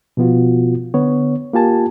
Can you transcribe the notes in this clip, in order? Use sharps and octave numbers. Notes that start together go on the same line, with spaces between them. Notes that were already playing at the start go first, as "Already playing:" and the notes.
B2 F3 B3 F4 F#4
D3 B3 C#5
A#3 F4 G4 G#5 A5